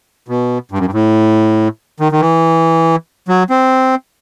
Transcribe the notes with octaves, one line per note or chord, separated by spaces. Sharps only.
B2
G2
F#2
G2
A2
D#3
D#3
E3
F#3
C4